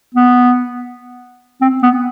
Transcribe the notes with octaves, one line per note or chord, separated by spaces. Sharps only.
B3
C4
B3